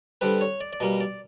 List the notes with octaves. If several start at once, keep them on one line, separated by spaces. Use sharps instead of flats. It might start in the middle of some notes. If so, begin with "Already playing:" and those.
D3 G3 C4 B4
C#5
D5
D5
B2 G3 A#3 D#5
D5